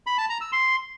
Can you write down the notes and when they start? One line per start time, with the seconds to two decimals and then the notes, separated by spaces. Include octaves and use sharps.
0.07 B5
0.18 A5
0.29 A#5
0.41 E6
0.52 C6